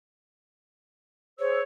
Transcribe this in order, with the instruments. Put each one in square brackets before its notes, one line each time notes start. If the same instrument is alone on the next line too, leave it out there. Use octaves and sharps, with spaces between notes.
[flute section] G#4 C5 E6 [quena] C#5